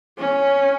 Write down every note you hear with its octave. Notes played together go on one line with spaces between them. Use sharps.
C#4